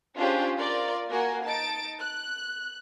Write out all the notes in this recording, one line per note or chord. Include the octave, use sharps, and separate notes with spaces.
C#4 D4 F4 G4 G#4 C5
F4 A#4 D5
A#3 F#4 A#4 G#5
D#4 A5 A6 D7
F#6